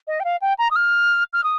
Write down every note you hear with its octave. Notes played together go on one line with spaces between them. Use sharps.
D#5
G5
F5
G5
A#5
D#6
F6
F6
D#6